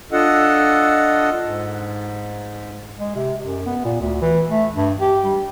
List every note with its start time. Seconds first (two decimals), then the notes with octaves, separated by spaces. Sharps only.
0.12 D4 F4 A4 D#5 F#5
1.44 G#2
2.99 G#3
3.16 C3
3.46 F#2
3.66 B3
3.85 A#2
4.00 D2
4.22 E3
4.50 A3
4.73 G2
5.00 G4
5.24 G3